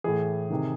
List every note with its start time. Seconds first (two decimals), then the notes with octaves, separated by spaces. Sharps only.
0.04 A2 E3 G#4
0.50 C3 D#3